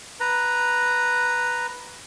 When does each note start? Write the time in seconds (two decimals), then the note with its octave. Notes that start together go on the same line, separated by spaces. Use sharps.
0.20 B4 A#5